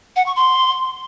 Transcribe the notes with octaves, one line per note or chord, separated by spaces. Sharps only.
F#5
C#6
C6